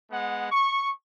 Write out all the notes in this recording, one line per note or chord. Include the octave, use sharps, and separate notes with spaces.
G#3 B3 F#5
C#6